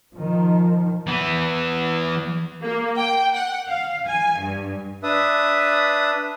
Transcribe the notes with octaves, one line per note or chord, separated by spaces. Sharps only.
D#3 F3
E3 B3
A#3
G5
F#5
F5
G#5
G2
D4 B4 E5 D#6